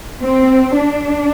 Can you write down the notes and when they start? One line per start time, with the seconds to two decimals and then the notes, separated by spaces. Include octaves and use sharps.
0.22 C4
0.77 D4